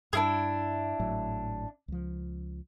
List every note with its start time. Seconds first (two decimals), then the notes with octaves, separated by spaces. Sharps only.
0.13 G2 G3 D4 E4 G#4
1.00 G#1 A2 F#3
1.88 C#2 F3